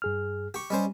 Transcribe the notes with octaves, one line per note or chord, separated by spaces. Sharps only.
G2 G#4 F6
G4 C#6
G3 C#4 C5 D#5